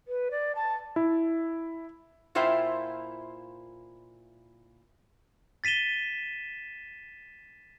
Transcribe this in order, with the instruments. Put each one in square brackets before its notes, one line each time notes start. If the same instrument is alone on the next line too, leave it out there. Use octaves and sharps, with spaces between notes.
[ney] B4
D5
A5
[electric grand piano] E4
[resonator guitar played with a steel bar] A#2 E4 F4 C5 E5 G5
[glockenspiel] A6 B6 D#7 E7 G7